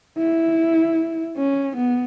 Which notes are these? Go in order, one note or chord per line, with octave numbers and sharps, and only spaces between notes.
E4
C#4
B3